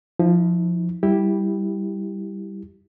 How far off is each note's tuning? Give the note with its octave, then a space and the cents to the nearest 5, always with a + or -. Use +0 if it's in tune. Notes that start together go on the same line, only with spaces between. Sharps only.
F3 +0 E4 -45
G3 +0 E4 -5 G4 +0